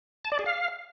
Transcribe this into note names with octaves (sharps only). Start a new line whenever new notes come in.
A5
D5
G#4
F5